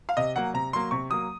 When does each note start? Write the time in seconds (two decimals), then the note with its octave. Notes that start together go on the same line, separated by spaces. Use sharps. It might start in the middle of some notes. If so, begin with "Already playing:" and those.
0.09 F5
0.17 C3 D#5
0.36 F#3 A#3 F#5
0.54 C3 A#5
0.73 F#3 A#3 C6
0.91 C3 C#6
1.10 F#3 A#3 D#6